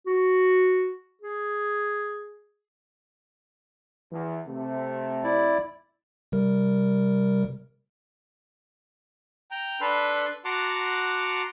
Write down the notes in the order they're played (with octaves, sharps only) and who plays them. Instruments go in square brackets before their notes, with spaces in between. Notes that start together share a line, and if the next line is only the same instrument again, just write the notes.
[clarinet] F#4
G#4
[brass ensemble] E2
C3 A3
[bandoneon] E4 D5
[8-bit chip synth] C3 G3 A#4
[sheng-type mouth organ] G5 A#5
D4 A4 B4 B5 C6
F#4 F#5 A5 A#5 C6 D6